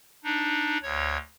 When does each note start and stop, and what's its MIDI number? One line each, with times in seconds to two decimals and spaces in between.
0.24 0.78 62
0.24 0.78 63
0.82 1.17 38
0.82 1.17 73